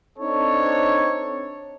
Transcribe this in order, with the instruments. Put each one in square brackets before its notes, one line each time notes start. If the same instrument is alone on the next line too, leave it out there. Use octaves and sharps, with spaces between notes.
[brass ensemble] C4 D4 D#4 A4 C#5